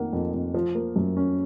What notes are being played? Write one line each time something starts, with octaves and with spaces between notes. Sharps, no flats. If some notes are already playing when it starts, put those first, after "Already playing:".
Already playing: F2 D#3 A#3 F#5
F2
F2
F3
A#3
F#2
C#4